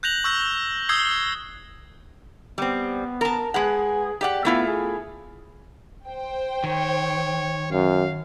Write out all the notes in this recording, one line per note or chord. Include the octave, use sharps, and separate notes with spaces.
F#6 G6 A#6 F7 F#7
C#6 E6 G6 A#6
D#6 E6 G6 G#6 C7 G7
G3 B3 C4
A#4 A5
G#3 G#4 B4 F#5
G4 D5 F#5
A3 B3 E4 F4
G#4
C5 G5
D#3 C#5
F#2 F5